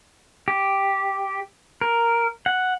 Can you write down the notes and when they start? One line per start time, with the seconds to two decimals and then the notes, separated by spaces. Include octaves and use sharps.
0.48 G4
1.81 A#4
2.46 F#5